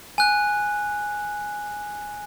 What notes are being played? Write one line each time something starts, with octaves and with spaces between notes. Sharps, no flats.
G#5 F#6